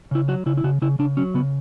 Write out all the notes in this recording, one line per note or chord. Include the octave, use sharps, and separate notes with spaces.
C#3 E4
F#3 F#4
C#3 E4
E4
C#3 F#4
C#3 E4
C#3 D4
F#3 C#4
C#3 B3